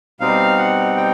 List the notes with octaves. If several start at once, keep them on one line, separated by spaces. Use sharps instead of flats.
B2 G3 C4 D#4 F5
F#5
G5